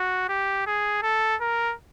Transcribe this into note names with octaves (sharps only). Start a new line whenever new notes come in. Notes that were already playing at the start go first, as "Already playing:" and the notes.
Already playing: F#4
G4
G#4
A4
A#4